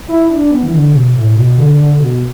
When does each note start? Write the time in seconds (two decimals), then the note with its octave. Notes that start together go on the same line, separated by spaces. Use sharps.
0.08 E4
0.30 D4
0.51 B3
0.63 E3
0.73 D3
0.93 B2
1.15 A2
1.35 B2
1.57 D3
1.78 D3
2.00 B2